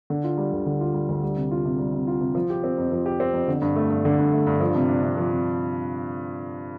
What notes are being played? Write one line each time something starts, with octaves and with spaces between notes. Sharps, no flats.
D3
F4
G3
D2
D3
F4
G3
D2
G3
C3
F4
C3
G3
C3
F4
C3
F3
G4
C4
F2
F3
G4
C4
F2
D3
G2
A3
G2
D3
G2
A3
G2
F3
C3
D4
C3
F3
C3